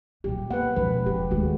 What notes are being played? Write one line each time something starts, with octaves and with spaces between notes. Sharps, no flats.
A#2 F#3 G4
A#3 B4 F#5
E1 F2 F3 G#3 C#4 B4
F1 G4
D#2 G#3 A3 F#4